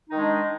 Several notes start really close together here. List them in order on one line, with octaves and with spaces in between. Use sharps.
D#4 D#3 G#3 D4